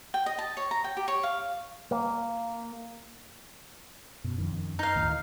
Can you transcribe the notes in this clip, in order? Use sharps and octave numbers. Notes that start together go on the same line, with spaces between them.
G5
D#5
A5
C#5
A#5
G5
G4
C#5
F5
A#3
F#2 B2
F2 D#3
D#4 F5
D2 A2 D#3